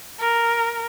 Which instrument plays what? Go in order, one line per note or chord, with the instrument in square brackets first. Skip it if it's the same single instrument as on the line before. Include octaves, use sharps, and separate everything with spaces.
[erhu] A#4